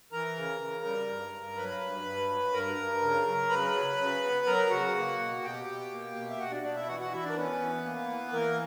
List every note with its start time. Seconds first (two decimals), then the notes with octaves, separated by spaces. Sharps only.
0.12 E3 A#4 A#5
0.36 C#3
0.61 C#3
0.85 G3
1.09 G2
1.34 G2
1.57 F#3 B4 B5
1.81 G2
2.06 G2
2.29 F#3
2.53 G2 A#4 A#5
2.78 G2
3.02 C#3
3.26 F#3
3.49 C#3 B4 B5
3.74 F#3
3.98 C#3
4.23 B3
4.46 F#3 A#4 A#5
4.70 C#3 F#4 F#5
4.95 A#3
5.19 B2
5.43 B2 G4 G5
5.67 B2
5.92 A#3
6.16 B2
6.30 E5
6.39 B2 F#4 F#5
6.51 D4 D5
6.63 B2 D4 D5
6.75 E4 E5
6.88 E3 F#4 F#5
7.00 F#4 F#5
7.12 E3 E4 E5
7.24 D4 D5
7.30 A#4
7.36 B3 C#4 B4
7.60 E3
7.84 A#3
8.08 E3
8.32 E3 A#3 A#4